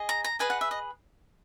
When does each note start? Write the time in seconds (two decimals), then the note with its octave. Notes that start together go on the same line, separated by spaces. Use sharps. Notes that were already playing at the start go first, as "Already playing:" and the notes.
Already playing: G#4 D#5
0.09 A#5
0.24 A#5
0.39 G#4 B4 D#5 G#5
0.50 F#5
0.61 E5
0.71 D#5